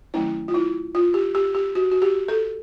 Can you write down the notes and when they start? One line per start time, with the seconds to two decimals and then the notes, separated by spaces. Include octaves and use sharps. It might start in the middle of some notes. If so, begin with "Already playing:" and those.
0.14 D#3 F#3 A3 C#4 E4
0.48 F4
0.54 E4
0.95 F4
1.14 G4
1.35 G4
1.55 G4
1.75 F#4
1.92 F#4
2.02 G4
2.28 A4